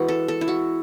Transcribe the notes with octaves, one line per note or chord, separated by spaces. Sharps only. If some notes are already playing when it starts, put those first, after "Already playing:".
Already playing: E3 G#3 B3 F#4
A4
A4
E4
F#4